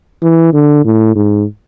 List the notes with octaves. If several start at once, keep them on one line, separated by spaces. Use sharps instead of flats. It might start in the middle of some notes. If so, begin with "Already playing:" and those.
E3
D3
A2
G#2